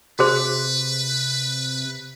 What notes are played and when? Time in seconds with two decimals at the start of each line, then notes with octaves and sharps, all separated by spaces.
0.19 C3 F#4 G#4 B4 C5